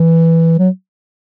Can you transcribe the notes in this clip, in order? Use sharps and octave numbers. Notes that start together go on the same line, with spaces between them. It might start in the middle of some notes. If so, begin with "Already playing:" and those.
Already playing: E3
F#3